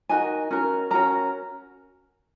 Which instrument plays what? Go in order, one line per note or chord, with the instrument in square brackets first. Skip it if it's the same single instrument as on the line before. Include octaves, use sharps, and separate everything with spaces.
[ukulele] D#4 F#4 A#4 G#5
C#4 F#4 A#4
C#4 F#4 A#4 A#5